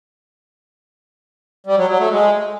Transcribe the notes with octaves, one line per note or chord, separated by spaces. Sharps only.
G3
F#3
F#3
A3
G#3